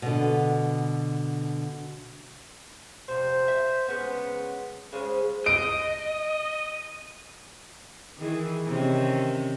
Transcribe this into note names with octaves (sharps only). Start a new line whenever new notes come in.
B2 D3
F2 C3 C5
E5
C#3 G#3 B3 C#4
C#3 G#3 G#4 C5
D#5 D7
D#3 E3 G#4
C3 D#3 C#4